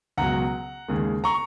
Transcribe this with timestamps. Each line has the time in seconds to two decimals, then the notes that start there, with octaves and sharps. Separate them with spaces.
0.17 C#2 B2 F#3 F#5 A#5
0.88 D#2 C#3 G#3
1.24 A#5 C#6